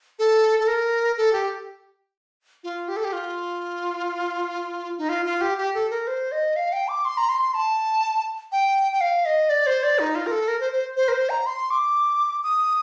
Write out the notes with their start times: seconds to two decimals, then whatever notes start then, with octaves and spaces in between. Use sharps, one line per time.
0.19 A4
0.59 A4
0.67 A#4
1.17 A4
1.33 G4
2.64 F4
2.88 G4
2.96 A4
3.04 G4
3.13 F4
4.98 D#4
5.09 F4
5.25 F4
5.41 G4
5.58 G4
5.74 A4
5.90 A#4
6.07 C5
6.32 D#5
6.56 F5
6.72 G5
6.88 D6
7.05 C6
7.17 A#5
7.29 C6
7.42 C6
7.54 A5
8.52 G5
8.92 G5
9.01 F5
9.25 D#5
9.49 D5
9.66 C5
9.83 D5
9.99 D#4
10.15 F4
10.26 A#4
10.31 A4
10.48 A#4
10.60 C5
10.73 C5
10.97 C5
11.08 A#4
11.13 C5
11.30 A#5
11.46 C6
11.70 D6
12.43 D#6